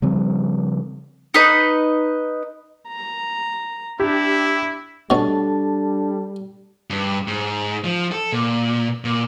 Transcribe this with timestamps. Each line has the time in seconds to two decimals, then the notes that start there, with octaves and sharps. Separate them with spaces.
0.02 C#3 F3 G3 C4
1.34 D#4 B4 D#5
2.88 A#5
4.00 D4 E4 G4
5.10 B2 G3 C#4 D4 A4 A5
6.90 G2
7.27 G#2
7.84 F3
8.12 A4
8.32 A#2
9.04 A#2